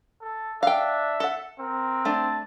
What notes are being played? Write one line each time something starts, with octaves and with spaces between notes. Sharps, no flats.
A4
D4 E5 F5 G5
A4 F#5
C4 A#4
A3 D4 A5